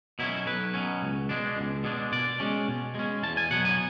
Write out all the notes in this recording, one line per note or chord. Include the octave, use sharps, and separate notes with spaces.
B2 F#3 C#4 E4
B1 B4
B2 F#3 C#4
C#2
B2 G#3 D4
C#2
B2 G#3 D4
B2 D5
G#3 C#4
B2
G#3 C#4
E2 A5
G#5
B2 F#3 B3 F#5
G#5